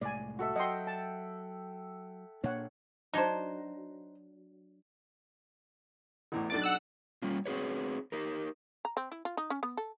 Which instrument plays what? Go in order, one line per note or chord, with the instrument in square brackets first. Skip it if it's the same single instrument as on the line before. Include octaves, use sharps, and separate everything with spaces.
[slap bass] C2 A2 G#3 [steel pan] D5 G#5
[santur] F#4 A4 E5
[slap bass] F#3 [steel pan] D#5 C6 [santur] F#5 G5
[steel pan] A5
[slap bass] A#2 A#3 D4 [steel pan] C#5 F#5
[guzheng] F#3 D4 [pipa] D#4 C5
[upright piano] A1 E2 A2
[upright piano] B1 D4 D7 [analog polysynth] A6
[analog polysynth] F#5 E6 F#6
[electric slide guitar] G3 A#3 C#4 F4
C4 F#4 G#4 B4 C#5
D#4 G4 A#4
[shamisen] A#5
C4
E4
F4
D#4
C#4
B3
A4